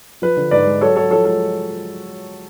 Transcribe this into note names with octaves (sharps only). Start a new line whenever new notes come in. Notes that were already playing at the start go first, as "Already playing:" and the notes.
F3 B4
D3
G#2 B4 D5
G#3
F#3 A4 C#5
F#3 A4 C#5
F3 A4 C#5
G#3 A4